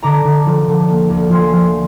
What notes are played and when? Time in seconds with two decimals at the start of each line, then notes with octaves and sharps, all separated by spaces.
0.02 D3 A#5 D6
0.24 D3
0.46 F3
0.67 D3
0.88 A#3
1.10 D2
1.29 F3 G#5 C6
1.53 F3